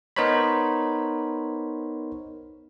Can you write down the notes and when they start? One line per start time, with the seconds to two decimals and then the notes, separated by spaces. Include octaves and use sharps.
0.16 B3 D#4 A#4 C5 C#5 B5